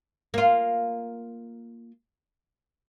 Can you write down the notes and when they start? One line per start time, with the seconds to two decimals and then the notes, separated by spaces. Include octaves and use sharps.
0.34 A#3 F4